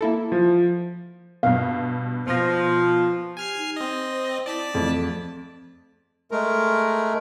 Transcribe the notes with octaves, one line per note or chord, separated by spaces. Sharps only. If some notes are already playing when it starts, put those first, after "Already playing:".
A#3 E4 A4
F3
G2 B2 F5
B2 F3 A#6
G4 G#5 F6 C7
D#4
C4 D#5
C5
E4 D5 A5 B6
F2 A3
G#3 A3 A#4